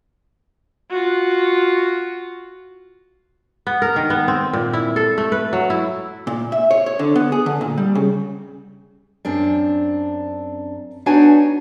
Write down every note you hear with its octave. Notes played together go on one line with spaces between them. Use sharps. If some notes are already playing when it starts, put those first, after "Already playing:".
F4 F#4
B3
A#4
D#3
B3
C4
A#2
E4
A4
A3
B4
F#3
E4
A#2
E5
C#5
C#5
D3
B3
G#4
D3
A#2
G3
C#3
F#2 C4 D4
B3 D4 D#4 F#4 C#5 G#5